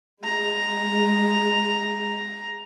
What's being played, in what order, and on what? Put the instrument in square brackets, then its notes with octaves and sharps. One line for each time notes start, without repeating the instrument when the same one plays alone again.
[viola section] G#3 [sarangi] A#5